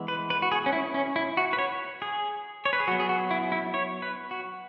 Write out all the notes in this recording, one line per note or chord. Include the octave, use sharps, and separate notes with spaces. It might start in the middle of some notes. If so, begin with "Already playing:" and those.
Already playing: E3 G#3 B3
B4
B4
F#4
G#4
C#4
E4
C#4
E4
F#4
B4
C#5
G#4
C#5
B4
G#4
F#3 B3 F#4
G#4
F#4
E4
E4
C#5
B4
F#4